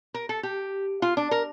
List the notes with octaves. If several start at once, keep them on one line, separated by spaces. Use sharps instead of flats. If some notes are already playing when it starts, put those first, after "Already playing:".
A#4
A4
G4
F4
D4
A#4